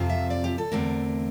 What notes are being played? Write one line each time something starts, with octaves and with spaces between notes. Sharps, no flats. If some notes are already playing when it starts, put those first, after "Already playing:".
Already playing: F2 C3 F3 C4 F4
E5
D5
G4
A4
E2 D3 A3 C4 A#4